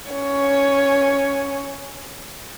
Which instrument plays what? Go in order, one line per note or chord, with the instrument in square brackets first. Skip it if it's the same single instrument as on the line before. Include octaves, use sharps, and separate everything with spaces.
[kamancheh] C#4 C#5